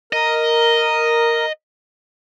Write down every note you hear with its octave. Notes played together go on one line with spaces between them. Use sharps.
A#4 D#5